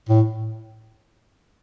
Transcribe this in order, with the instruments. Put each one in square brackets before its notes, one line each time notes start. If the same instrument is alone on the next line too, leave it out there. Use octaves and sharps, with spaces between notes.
[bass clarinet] A2